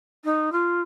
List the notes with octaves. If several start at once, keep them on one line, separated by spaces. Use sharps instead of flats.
D#4
F4